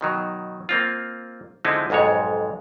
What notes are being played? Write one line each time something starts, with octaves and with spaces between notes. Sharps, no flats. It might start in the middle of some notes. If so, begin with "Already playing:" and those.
B2 D#3 F#3
A#3 C4 F4
D3 F3 G#3 C4 D#4 E4
B1 F2 G#2 G#3 C#5